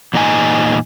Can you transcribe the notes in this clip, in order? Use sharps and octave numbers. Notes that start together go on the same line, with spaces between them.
E2 A#2 D#4 E4 G#5